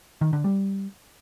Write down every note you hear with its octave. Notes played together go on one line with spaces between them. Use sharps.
D#3
D3
G3